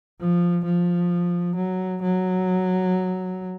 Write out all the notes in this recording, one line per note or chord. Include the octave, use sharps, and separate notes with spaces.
F3
F3
F#3
F#3